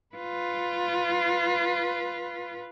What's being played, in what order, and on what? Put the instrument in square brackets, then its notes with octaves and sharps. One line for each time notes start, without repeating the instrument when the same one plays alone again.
[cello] F4 B4